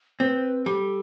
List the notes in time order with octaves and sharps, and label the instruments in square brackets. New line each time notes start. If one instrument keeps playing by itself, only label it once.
[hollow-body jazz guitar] C4 [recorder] B4
[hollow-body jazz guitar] G3 [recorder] A4